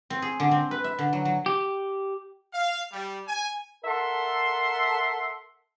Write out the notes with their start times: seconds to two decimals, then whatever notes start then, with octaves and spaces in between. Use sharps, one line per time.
0.10 C4
0.22 G#4
0.40 D3
0.51 C4
0.71 B4
0.84 E5
0.99 D3
1.13 F#3
1.25 F#3
1.46 G4
2.54 F5
2.92 G3
3.27 G#5
3.85 A4 A#4 E5 F#5 C6